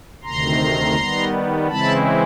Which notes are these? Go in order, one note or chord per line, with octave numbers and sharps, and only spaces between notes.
D2 C3 D#3 A#5 C6
D#3 G3 B3
C#3 E3 G#3 C4 E4 A5 B5